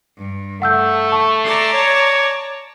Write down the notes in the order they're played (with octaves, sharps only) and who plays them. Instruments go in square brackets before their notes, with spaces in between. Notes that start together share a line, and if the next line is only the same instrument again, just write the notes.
[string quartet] G2
[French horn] A3 [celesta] F#5 E6 G6
[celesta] A5 C#6
[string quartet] D5 A5 A#5 [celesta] C7
[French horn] C#5